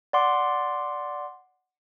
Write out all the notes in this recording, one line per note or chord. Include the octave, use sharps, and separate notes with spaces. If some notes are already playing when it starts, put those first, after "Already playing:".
D5 F#5 C6 D6